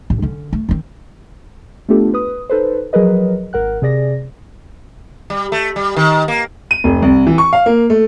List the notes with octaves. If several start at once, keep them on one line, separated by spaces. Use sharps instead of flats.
A1
D3 C#4
A3
D#3 C4
A3 B3 D4 F4 G4 A4
B4 D#6
D#4 A4 B4 C5
F3 F#3 G#4 A#4 B4 D#5
G#1 A#4 F#5 F#6
C3 G#4 D5 A#6
G3
A3
G3
D#3
A#3
D#7
F1
C2
E3
C#6
F5
A#3
A3